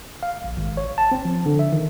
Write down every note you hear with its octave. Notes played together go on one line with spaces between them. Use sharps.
F5
A#1
G#1
C#5
A5
C4
F3
D3
E5
D#3